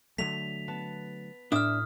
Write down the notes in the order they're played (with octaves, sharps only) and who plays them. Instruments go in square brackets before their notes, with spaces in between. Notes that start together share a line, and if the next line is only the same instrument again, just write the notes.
[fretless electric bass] D3 F#3 A3 [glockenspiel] B6 F7
[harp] B3 B4 A5
[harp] A2 [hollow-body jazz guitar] D4 E5 [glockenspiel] D#6 F6